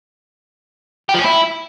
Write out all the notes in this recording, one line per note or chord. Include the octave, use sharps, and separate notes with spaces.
G4
F3
C#4
E4